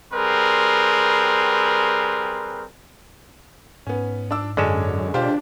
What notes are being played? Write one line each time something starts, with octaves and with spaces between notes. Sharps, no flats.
G3 C4 G#4 A#4 B4 C6
G#2 B3 C#4
D4 D6 E6
F#2 D3 G#3 C#4 D4 C#5 E7
B2 D4 F4 G4 C5